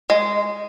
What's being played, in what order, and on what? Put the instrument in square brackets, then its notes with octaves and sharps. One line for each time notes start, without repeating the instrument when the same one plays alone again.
[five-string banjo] G#3